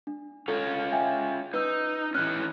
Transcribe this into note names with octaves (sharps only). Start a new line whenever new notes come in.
D4
C#4 F4 A4 C#5
E5 G5 G#5
D#4 B4 E6 G6
E3 C#4 F6 F#6